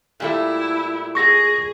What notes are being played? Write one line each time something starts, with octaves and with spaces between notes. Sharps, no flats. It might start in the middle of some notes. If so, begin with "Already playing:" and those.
A#2 G3 A3 E4
G#4 C#6 A#6